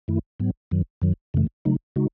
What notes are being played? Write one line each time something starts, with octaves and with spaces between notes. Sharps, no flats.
F#2 D#3 A3 E4
G#2 F#3 B3
F#2 D#3 F#3
F#2 D#3 F#3
F#2 C#3 E3 A3
C#3 F#3 A3 D#4
C#3 G#3 D#4 F#4